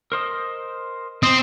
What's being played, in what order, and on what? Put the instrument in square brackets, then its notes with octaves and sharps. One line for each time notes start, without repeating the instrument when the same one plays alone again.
[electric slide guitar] A#4 C5 D#5
[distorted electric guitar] C4 [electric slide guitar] D#5